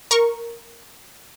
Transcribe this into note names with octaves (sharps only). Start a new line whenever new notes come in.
A#4 C#6